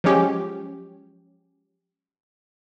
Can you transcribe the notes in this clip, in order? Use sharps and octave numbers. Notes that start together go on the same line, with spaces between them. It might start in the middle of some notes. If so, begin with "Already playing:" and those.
F3 F#3 G#3 C#4 G4